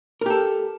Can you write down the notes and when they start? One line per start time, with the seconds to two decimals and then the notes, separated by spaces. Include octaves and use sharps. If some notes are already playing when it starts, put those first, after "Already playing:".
0.21 A#4
0.26 G4
0.30 A4